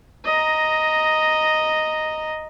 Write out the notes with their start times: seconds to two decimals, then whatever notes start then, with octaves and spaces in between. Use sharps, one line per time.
0.25 D#5 A#5